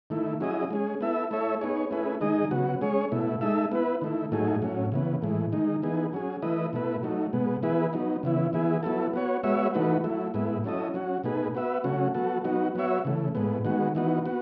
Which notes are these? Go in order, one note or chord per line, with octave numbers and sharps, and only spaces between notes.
D#3 A3 E4
F#3 C#4 E4 G#4 D#5
G#3 C#4 G#4
B3 E4 A4 E5
A3 E4 A4 C#5 E5
B3 D#4 G#4 C#5
A3 C#4 E4 G#4 B4
D#3 G#3 D#4 G#4 D#5
C#3 F#3 B3 F#4
G#3 C#4 G#4 C#5
B2 A3 E4
G#3 D#4 A4 E5
B3 E4 B4
D#3 A3 E4
A2 F#3 A3 D#4 G#4
A2 F#3 C#4
C#3 E3 B3
A2 E3 G#3
D#3 G#3 D#4
E3 B3 D#4 G#4
F#3 C#4 G#4
E3 A3 E4 B4 D#5
B2 A3 E4 B4
F#3 A3 D#4
B2 G#3 B3
E3 B3 E4 G#4 B4
F#3 B3 D#4
C#3 E3 B3 E4
E3 B3 E4 G#4
F#3 B3 E4 A4
B3 F#4 C#5
G#3 B3 F#4 C#5 E5
E3 A3 D#4 F#4 B4
F#3 A3 E4
A2 G#3 B3 E4
F#3 C#4 E4 A4 D#5
F#3 C#4 F#4
B2 A3 D#4 G#4 B4
B3 F#4 B4 E5
C#3 F#3 A3 C#4 F#4
F#3 B3 F#4 A4
F#3 B3 D#4 F#4
F#3 B3 F#4 C#5 E5
C#3 E3 A3
A2 G#3 B3
D#3 G#3 B3 F#4
E3 B3 D#4 F#4
B3 F#4